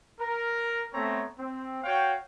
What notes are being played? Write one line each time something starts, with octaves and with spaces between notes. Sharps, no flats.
A#4
A3 B3 C4 A4 C#5 A#5
C4
F#4 C#5 F5 G5